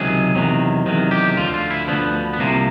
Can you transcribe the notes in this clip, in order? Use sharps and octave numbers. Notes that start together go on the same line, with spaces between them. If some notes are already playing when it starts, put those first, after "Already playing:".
Already playing: C#2 C3 D#3 F#3 G#4
E2 C3 D#3 F#3
E2 C3 D#3 F#3
G4
D2 D3 F3 F4
F4
E4
D2 D3 F3 B3
B3
C2 C3 F3 A#3